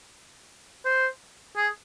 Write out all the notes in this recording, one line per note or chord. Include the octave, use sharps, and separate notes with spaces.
C5
G#4